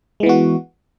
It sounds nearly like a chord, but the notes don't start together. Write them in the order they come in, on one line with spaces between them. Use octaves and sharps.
G#3 E3 B3 F#4